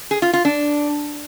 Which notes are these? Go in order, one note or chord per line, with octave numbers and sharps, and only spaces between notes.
G#4
F4
F4
D4